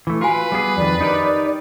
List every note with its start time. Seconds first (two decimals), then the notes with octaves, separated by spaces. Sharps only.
0.07 E3 A3
0.21 F4 F#4 B4 G#5
0.52 G3 B3 G#4
0.77 F2 D#3 D5
1.01 D#4 G4 A#4